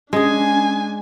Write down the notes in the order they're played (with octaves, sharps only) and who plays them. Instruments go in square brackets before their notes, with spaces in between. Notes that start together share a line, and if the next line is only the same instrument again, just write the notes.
[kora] G#3 G#4 [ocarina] C#4 [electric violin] D4 G#5